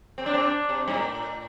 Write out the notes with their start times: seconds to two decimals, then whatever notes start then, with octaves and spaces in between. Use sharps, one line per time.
0.18 C4
0.26 D4
0.34 C4
0.43 D4
0.69 C3
0.88 G2
0.94 A2